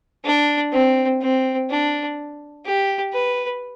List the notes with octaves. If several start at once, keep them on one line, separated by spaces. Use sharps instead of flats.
D4
C4
C4
D4
G4
B4